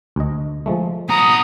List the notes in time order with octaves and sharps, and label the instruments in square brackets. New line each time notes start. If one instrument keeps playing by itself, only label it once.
[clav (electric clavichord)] D2 D#5
F3 G#3 A3
[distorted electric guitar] B3 A#5 [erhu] D#6